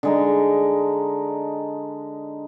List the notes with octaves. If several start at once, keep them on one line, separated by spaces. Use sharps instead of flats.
D3 G#3 D#4